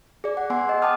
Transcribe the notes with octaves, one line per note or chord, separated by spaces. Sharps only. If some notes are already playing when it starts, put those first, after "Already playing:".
G#4 D5
F#5
B3 F#5 G#5 C6
G#4 D#5
F#5 G5 A5 D6 D#6 F6